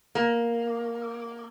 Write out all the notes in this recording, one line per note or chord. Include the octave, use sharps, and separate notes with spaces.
A#3